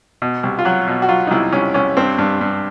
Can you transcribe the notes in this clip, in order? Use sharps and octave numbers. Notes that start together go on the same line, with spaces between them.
B2
C2
F4
F#3 F#4
B2
F#4
F#3 F4
D#4
C2 E4
C2 C#4
C2 C#4
G2 C4
G2
G2